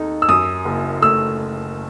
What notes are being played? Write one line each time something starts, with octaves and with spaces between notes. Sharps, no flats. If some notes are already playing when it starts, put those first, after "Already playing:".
Already playing: D#2 D#4 A4
E6
F#2 D#6
F#1
A3 E6